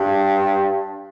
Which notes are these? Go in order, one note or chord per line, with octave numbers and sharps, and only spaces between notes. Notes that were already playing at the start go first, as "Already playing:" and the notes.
Already playing: G2